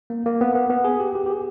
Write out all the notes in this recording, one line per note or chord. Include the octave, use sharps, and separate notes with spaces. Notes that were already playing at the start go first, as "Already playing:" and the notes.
A#3
A#3
B3
B3
B3
G#4
G4
G4
G4
G#4